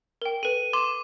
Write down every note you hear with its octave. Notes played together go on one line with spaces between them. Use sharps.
A#4 G5
A4 B4 D#7
C6 D6 E7